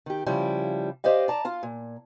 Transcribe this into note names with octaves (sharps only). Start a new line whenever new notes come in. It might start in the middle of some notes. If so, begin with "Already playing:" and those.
D#3 G4
C#3 F3 G3 E4
G4 C5 D5 D#5 F5
D5 A5 A#5
F4 F5
A#2